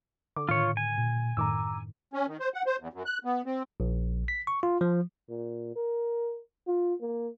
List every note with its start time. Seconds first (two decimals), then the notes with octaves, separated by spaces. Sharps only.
0.36 D3 D6
0.49 A2 D#3 F4 C#5
0.77 G#5
0.98 A#2
1.37 F#2 A2 D#3 A#5 D6 E6
2.13 C#4
2.28 D#3
2.40 C5
2.54 F#5
2.66 C5
2.80 E2
2.93 F#2
3.06 F#6
3.24 B3
3.46 C4
3.80 A#1
4.28 B6
4.47 C#6
4.63 F4
4.81 F3
5.29 A#2
5.76 A#4
6.67 F4
7.01 A#3